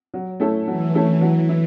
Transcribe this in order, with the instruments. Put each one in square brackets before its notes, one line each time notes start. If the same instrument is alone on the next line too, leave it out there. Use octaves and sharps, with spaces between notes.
[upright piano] F#3
A3 C#4 E4 A4
[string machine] E3 [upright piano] F#3
[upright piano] A3 C#4 E4 A4
[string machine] E3 [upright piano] F#3
[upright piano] E4